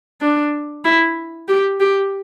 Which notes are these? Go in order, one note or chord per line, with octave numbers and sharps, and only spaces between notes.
D4
E4
G4
G4